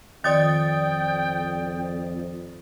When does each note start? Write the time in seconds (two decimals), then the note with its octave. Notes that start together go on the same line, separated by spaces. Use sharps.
0.24 F2 D#3 D5 G5 D#6 A6